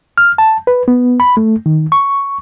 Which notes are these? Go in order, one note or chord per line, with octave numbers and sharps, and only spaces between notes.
F6
A5
B4
B3
B5
A3
D#3
C#6